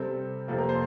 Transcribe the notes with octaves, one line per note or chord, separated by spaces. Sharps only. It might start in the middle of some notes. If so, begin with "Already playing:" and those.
Already playing: C3 G3 C4 A4
F2 C3 F3 A#3 A4
A#4
C5